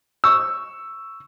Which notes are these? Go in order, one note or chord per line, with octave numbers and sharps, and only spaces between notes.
C#6 E6